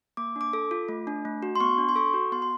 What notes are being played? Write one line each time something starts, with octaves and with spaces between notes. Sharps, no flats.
A#3 D6
D4
D6
A4
F4
A3
D4
A3
F#4
C6
B3 C#6
D4
C6
A4 C#6
F#4
B3 C6
C6